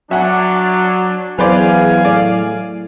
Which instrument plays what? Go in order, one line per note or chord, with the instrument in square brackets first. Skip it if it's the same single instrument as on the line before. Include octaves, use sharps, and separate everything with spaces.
[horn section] F#3 D4 [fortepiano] E5 F#5 G#5
[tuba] E2 [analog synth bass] F#3 [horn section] G#4 F5 G#5 [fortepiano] B4 C5 D5
[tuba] A2 [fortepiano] D5